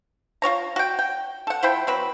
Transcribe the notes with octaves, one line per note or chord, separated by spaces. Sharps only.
F4 F#4 C#5 A#5
F#4 G5
G5
A4 F#5
F3 E4 C5 G5
F#3 C4 B4